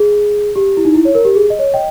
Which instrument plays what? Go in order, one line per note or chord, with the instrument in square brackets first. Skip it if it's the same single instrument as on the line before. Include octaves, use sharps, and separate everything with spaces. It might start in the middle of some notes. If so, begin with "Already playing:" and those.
Already playing: [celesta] G#4
G4
E4
D#4
E4
C#5
A#4
G4
G#4
D#5
C#5
D#5 G5